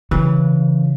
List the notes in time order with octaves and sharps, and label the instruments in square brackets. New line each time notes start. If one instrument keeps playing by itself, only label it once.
[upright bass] C#3 [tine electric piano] E3